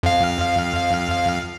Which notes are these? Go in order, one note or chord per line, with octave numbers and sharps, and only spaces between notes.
F2 F5